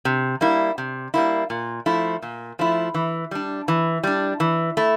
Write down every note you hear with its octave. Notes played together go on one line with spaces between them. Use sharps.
C3
G3 A#3 E4
C3
G3 A#3 E4
A#2
F3 A3 E4
A#2
F3 A3 E4
E3
G3 D4
E3
G3 D4
E3
A3 E4